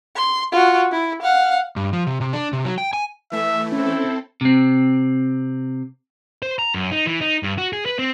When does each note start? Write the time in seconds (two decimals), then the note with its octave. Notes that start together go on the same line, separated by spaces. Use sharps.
0.16 C6
0.52 F4 F#4
0.92 E4
1.22 F5 F#5
1.76 G2
1.93 F3
2.07 C3
2.21 C3
2.33 D4
2.53 C3
2.65 F#3
2.78 G5
2.93 G#5
3.32 E3 A3 E5
3.72 C4 C#4 E4 A4 C5
4.41 C3 C4
6.42 C5
6.59 A#5
6.74 F#2
6.92 D#4
7.07 E3
7.21 D#4
7.43 G2
7.58 F#4
7.73 G#4
7.86 B4
7.99 C4